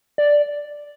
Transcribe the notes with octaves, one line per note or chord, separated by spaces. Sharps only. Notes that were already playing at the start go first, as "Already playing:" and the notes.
D5